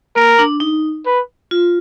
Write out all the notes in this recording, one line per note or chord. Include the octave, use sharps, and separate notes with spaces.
A#3 A#4
D4
D#4
B4
F4